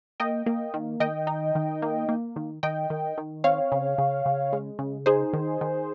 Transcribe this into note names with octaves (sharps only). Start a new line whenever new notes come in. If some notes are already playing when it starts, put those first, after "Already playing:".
A#3 D#5 G5
A#3
D#3
D#3 D#5 G5
D#4
D#3
A#3
A#3
D#3
D#3 D#5 G5
D#3
D#3
C4 C#5 F5
C#3
C#3
C#3
G#3
C#3
D#4 G#4 C5
D#3
D#3